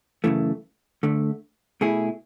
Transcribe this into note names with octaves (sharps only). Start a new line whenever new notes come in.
F#2 C#3 E3 A3
D2 D3 A3
B2 A3 E4 G#4